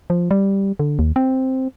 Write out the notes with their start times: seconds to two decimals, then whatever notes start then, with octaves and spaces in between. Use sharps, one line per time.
0.10 F3
0.31 G3
0.79 D3
0.99 D#2
1.16 C4